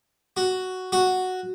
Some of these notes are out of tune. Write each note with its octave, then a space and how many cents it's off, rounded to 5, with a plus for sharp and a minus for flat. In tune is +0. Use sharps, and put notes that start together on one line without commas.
F#4 +5
F#4 +0